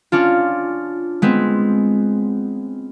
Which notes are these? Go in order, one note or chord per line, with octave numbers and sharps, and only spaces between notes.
C#4 D4 F4
G#3 B3 C4